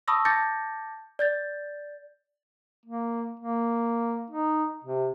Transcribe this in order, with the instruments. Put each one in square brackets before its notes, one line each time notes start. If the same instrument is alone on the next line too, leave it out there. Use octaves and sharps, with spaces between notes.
[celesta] A5 B5 C#6 D#6 E6 A#6
A5 D6 G6 A6 A#6 C#7
D5 G6 A6
[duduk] A#3
A#3
D#4
C3